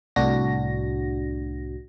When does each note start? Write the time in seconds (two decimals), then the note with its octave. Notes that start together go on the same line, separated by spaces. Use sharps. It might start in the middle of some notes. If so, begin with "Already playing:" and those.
0.16 C2 A2 D4 F#4 A#6